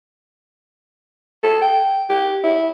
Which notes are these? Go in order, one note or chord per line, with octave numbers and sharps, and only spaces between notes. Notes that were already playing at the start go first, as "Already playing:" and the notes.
A4
G5
G4
E4